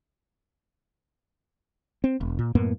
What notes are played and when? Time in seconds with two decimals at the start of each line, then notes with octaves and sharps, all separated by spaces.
2.04 C4
2.21 E1
2.39 A#2
2.55 F#2 A2 A#3 B3